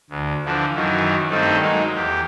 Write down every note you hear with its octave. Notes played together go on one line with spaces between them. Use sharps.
D2
D3 E3 F3
F#2 D#3 E3 F#3
G2 D#3 A3 C4 D#4 A4
F#3 G#3 A#3 D#4
E2 G4